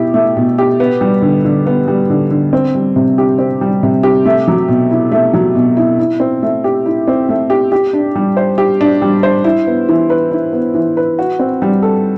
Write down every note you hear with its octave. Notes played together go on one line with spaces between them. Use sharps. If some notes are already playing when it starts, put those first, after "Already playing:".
Already playing: B2 E4 G4
A3
B2
G4
B3
G3
D3
D3
B3
G3
D3
D3
C4
G3
C3
G4
C4
G3
C3
G4
A3
F#3
B2
E4
A3
F#3
B2
E4
E4
C4
A3
G4
E4
C4
A3
G4
G4
D4
G3
C5
G4
D4
G3
C5
E4
B3
E3
B4
E4
B3
E3
B4
F#4
C4
G3
A4